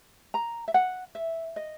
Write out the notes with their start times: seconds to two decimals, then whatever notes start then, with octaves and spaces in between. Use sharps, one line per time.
0.34 A#5
0.68 E5
0.74 F#5
1.15 E5
1.56 D#5